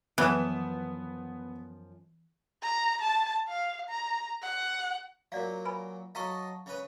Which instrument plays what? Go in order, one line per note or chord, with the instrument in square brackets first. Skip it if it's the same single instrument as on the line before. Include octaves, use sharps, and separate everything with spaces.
[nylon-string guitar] F#2 F3 [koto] E3 [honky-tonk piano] B3 E7
[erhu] A#5
A5
F5
A#5
F#5
[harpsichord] A#2 F#3 [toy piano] D5 F5
[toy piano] B4 G#5 B5
[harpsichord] F#3 A4 D#5 [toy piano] F5 A#5 C#6
[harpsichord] C#3 C#4 B4